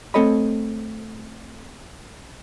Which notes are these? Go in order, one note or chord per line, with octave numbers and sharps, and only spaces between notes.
A3 C4 A4 C#5 D#5 B5